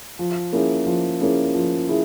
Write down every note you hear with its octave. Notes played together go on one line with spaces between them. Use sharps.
F3
A#3 C#4 E4 G#4
F3
A#3 C#4 E4 G#4
F3
E4 G#4